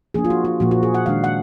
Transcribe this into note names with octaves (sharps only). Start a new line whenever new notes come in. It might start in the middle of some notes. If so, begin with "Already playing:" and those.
F3 A#3 D4 G#4
F4
F#4
F4
A#2 F3 A#3 F#4
F#4
G#4
F#5
D#3 G#3 D4 F5
F#5